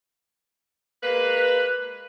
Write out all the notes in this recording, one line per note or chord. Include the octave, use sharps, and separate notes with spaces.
G#3 A#3 B4